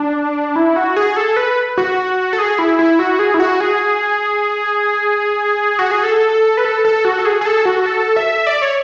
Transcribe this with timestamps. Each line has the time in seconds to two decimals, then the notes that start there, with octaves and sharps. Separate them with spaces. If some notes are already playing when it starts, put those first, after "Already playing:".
Already playing: D4
0.56 E4
0.76 F#4
0.96 G#4
1.16 A4
1.37 B4
1.78 F#4
2.33 A4
2.38 G#4
2.59 E4
2.79 E4
2.99 F#4
3.19 G#4
3.34 E4
3.40 F#4
3.60 G#4
5.79 F#4
5.91 G#4
6.04 A4
6.57 B4
6.65 A4
6.85 A4
7.05 F#4
7.19 A4
7.25 G#4
7.41 G#4
7.45 A4
7.65 F#4
7.86 A4
8.16 E5
8.47 D5
8.62 C#5